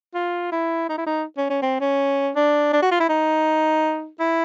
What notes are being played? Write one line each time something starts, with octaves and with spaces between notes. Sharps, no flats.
F4
E4
D#4
E4
D#4
C#4
C#4
C4
C#4
D4
D4
F#4
F4
E4
D#4
E4